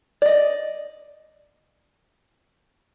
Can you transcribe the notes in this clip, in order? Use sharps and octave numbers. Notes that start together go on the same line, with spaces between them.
D5 D#5